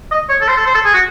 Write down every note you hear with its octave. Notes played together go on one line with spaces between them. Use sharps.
D#5
C#5
A4
C5
A4
C5
A4
G#4
F#4